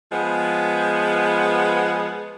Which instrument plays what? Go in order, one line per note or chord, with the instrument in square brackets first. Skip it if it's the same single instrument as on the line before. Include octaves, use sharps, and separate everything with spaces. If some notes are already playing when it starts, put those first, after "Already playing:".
[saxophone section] F3 G#3 B3